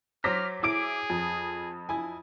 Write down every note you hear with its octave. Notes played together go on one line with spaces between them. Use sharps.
F#3 C5 D6 F6 A#6 B6
E4 G#4 D6 D7
F2
E4 G#5